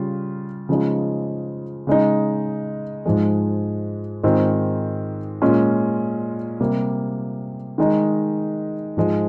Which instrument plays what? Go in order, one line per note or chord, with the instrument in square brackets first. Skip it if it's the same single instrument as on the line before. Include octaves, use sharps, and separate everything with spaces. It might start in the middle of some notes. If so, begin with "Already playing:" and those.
Already playing: [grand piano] C#3 G3 F4
C#3 F3 G#3 D#4
C#3 G#3 D#4
G#2 F3 G#3
G#2 D#3 G#3 C4 F4
A#2 G#3 C#4 F4
C3 G3 A#3
D#3 G#3 D#4
G#2 F3 G#3